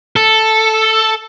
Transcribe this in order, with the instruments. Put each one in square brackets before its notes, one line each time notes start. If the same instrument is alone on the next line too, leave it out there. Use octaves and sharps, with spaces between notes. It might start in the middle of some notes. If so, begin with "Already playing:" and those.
[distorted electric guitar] A4